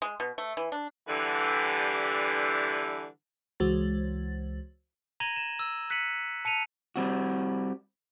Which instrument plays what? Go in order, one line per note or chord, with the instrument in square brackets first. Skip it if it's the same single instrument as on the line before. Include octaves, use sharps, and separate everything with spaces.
[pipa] G#3
B2
A3
E3
D4
[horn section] D3 E3 G3
[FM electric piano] C#2 E3 G#3 F#4 C5 A6
[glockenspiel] A#5 G#6 A#6 D#7 F#7 G7
E7
E6
F#6 B6 C#7 D#7 F#7
A5 C#7 D#7 F7
[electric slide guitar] G3 C4 F#4